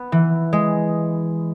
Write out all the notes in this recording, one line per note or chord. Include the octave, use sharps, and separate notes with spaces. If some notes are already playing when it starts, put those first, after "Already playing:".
Already playing: B3
E3
G#3